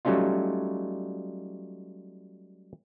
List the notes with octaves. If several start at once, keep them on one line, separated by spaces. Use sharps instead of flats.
F#3 G3 A3 C#4 D#4 F4